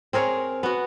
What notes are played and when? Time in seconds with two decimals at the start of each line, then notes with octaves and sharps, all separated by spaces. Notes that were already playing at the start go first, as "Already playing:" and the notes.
0.13 C4 G#4 A#4 C#5
0.63 B3 F#4